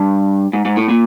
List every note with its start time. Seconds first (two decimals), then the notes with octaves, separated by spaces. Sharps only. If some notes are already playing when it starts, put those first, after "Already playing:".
Already playing: G2
0.53 G#2
0.65 G#2
0.77 A2
0.89 A#2